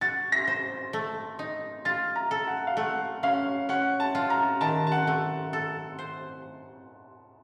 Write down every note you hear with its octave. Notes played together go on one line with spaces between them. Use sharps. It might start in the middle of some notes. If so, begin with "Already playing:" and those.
F#4 A6
A#6
C5
A3
D#4
F4 A6
A#5
A4
F#5
F5
A3 F#5
C#4 F5
C#4 F#5
A5
F4
A#5
D#3 A5
A5
F#5
A3
A4
C5